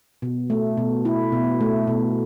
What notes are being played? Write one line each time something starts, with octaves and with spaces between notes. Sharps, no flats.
B2
A3
B2
E4
B2
A3
B2